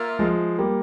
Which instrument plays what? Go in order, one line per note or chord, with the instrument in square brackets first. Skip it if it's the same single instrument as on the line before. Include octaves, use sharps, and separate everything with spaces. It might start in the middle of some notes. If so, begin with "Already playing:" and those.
Already playing: [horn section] A#3 F4 A#4 E5
[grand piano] F3 G#3
G3 A#3